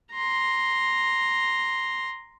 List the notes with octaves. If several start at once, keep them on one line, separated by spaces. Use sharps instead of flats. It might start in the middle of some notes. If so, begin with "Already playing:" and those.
A#5 C6